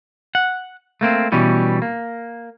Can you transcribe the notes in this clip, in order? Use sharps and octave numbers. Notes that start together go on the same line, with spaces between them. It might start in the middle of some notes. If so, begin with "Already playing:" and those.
F#5
A3 A#3 C4
B2 E3 G3 C#4
A#3